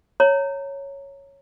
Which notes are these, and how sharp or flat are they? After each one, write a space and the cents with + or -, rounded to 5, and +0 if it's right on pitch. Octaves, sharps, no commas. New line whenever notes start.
C#5 +0 A#5 -25